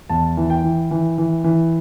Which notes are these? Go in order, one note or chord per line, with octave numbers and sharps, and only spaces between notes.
E2 A5
E3
G5
E3
E3
E3
E3